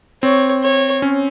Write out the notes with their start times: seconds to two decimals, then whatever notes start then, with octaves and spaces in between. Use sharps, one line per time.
0.23 C4 C#5
0.63 C#5
1.02 C#4